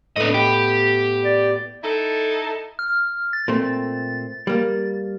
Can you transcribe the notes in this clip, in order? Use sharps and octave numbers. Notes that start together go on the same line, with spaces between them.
A2 B3 D4 D#5
G4
D5
D#4 E4 A4
F6
A6
A#2 A3 C4
G3 A#3